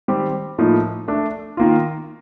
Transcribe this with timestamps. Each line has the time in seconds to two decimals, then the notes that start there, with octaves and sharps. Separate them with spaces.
0.08 D#3 G3 C4 G4
0.58 A2 F3 A#3 D#4
1.08 A3 D4 A4
1.57 D#3 A#3 F4